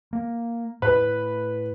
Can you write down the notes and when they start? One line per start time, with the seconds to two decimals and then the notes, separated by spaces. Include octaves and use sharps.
0.13 A#3
0.82 A2 B4